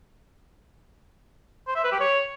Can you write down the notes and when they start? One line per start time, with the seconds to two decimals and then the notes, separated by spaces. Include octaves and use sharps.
1.67 C5
1.75 E5
1.84 B4
1.92 G4
2.00 C#5